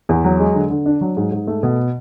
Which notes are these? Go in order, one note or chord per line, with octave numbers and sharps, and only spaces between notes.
E2
F#3
G#3
D3
D3
D4
F#3
G#2
G#2
A3
B2